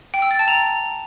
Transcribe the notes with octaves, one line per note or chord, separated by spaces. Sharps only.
G5
E6
A6
A5
A#5